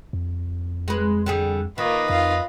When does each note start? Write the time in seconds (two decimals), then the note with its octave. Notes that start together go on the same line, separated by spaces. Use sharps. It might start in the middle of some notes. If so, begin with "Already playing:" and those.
0.13 F2
0.88 G#3 B4
1.26 D3 G3 G#4
1.78 D#3 A#3 F4 B4 D#5
2.10 F2 F4 F5